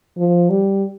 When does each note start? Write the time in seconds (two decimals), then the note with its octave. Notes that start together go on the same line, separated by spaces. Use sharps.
0.17 F3
0.50 G3